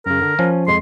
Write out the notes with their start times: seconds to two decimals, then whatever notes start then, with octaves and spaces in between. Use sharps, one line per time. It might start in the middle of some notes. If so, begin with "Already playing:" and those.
0.06 F#2 C#3 A#4
0.22 D3
0.39 F3 C#4
0.68 F2 G#3 C6